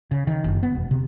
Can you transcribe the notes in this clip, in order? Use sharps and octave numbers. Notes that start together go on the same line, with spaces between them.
C#3
D#3
F#1
B3
E1
C3